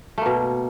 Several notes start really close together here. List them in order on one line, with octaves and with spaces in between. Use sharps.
A3 A#3 B2